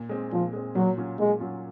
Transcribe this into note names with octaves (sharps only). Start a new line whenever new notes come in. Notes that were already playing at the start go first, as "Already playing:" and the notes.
Already playing: A#2
G#3 C4
A#2 F3
G#3 C4
A#2 F#3
F#3 C#4 F4
A#2 G#3
F#3 C#4 F4